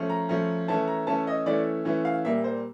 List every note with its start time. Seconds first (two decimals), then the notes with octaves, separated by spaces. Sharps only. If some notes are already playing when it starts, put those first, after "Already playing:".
Already playing: F3 A3 C#4
0.10 A#5
0.29 F3 A3 C#4
0.68 E3 A3 C#4 E4 A5
0.88 A#5
1.07 E3 A3 C#4 E4 A5
1.27 D#5
1.46 E3 A3 C#4 E4 D5
1.85 E3 A3 C#4 E4
2.05 F5
2.25 A#2 G3 A#3 E5
2.44 C5